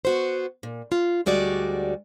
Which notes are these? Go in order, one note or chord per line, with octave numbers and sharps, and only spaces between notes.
B3 F#4 C5
A#2
F4
D2 G3 G#3 F#4 D5